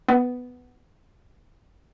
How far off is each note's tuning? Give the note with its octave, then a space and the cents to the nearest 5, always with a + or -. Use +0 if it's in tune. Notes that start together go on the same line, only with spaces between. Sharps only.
B3 +5